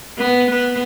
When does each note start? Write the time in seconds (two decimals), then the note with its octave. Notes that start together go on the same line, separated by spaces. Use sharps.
0.18 B3
0.50 B3